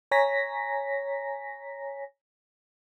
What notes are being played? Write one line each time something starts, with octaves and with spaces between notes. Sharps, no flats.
C#5 G#5 A#5 A#6 B6